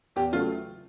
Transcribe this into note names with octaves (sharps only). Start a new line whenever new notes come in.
E2 G4
C#3 F#3 A3 F4